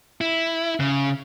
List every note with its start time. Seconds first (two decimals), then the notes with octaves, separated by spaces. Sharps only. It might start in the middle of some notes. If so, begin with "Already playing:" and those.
0.21 E4
0.80 C#3